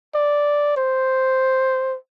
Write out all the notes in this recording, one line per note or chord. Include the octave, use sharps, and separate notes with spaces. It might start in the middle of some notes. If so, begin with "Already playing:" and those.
D5
C5